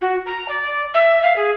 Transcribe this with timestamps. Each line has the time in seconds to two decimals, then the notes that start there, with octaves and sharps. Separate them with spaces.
0.01 F#4
0.26 A#5
0.48 D5
0.94 E5
1.22 F5
1.36 G#4